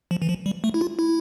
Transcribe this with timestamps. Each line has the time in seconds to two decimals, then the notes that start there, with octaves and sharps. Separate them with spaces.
0.11 F3
0.22 E3
0.29 F3
0.46 G3
0.64 A3
0.74 E4
0.81 F4
0.99 E4